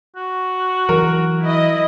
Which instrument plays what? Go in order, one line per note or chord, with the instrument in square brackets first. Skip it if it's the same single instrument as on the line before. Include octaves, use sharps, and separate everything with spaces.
[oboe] F#4
[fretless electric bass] E3 F#3 [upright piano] A#4
[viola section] E4 D#5